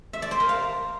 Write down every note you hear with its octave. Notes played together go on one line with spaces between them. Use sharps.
E5
D5
C5
A#4
F5